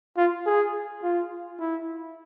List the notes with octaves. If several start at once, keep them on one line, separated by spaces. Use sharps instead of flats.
F4
G#4
F4
E4